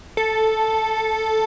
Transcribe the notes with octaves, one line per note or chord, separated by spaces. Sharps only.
A4